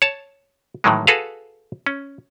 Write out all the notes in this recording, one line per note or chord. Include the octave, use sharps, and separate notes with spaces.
C#5 A5
A2 D#3 E3 F#3 G#3
F#4 G#4 A4 B4 F5
C#4